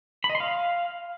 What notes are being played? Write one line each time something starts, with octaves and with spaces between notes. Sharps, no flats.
B5
D#5
C6
F5